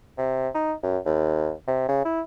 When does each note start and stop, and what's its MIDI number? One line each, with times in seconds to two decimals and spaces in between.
0.18 0.49 48
0.54 0.73 63
0.83 0.98 42
1.06 1.51 39
1.68 1.85 48
1.89 2.02 49
2.05 2.21 64